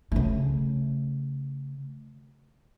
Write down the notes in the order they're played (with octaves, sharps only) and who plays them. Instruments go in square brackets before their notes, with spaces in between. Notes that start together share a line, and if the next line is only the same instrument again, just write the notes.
[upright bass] C#3 A3